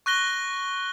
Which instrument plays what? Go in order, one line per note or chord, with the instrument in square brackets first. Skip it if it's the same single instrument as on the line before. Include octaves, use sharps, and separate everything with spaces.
[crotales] C#6 F#6 A#6 G7